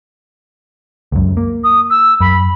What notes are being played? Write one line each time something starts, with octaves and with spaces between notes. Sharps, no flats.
C#2 F#2
A#3
D#6
E6
F#2 B5